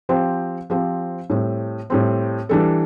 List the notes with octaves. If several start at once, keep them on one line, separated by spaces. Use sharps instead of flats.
F3 C4 G4 C5
F3 C4 G4 C5
A2 G3 C4
A2 G3 C4
E3 G3 D4 A4